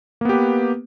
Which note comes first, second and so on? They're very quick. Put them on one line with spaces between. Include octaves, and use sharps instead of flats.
A#3 B3 G4 B4